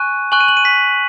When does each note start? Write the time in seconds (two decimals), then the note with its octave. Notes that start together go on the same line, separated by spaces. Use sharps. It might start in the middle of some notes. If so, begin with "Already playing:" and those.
Already playing: G#5 C#6 F#6 D#7
0.32 G#5 C#6 F#6 F#7
0.40 D#7
0.48 F#7
0.57 D#7
0.65 B6